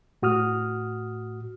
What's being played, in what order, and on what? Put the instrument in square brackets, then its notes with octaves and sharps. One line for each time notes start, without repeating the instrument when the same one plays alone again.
[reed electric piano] A2 F#4 D#6 F6